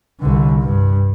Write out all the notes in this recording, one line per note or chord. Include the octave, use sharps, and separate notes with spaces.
C2 D3
G2